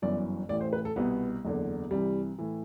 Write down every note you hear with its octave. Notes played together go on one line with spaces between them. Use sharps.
G1 F#2 E3 D5
A1 A2 E3 D5
C5
B4
A4
C2 B2 B3
F#1 E2 D3
C2 C3 E3 G3
A2 E3